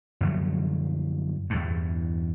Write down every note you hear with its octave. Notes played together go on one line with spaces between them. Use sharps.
F#2 D3 F3 F#3
E2 G2